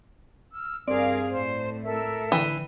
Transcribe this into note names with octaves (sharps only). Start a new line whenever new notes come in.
E6 F6
G2 C4 G#4 A#4 D5 F5
A2 A3 C5
A4 A#4 E5
D3 E3 G5